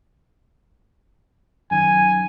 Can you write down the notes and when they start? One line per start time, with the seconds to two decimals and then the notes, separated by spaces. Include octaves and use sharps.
1.71 F#2 D#3 G#5